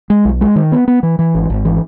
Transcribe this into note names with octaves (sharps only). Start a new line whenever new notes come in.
G#3
B1
G#3
D#3
B3
B3
E3
E3
G#1
G#1
E3